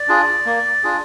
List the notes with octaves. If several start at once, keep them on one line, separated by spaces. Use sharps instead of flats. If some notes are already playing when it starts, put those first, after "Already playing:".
Already playing: D5
D4 F4 G#4
A#3
D4 F4 G#4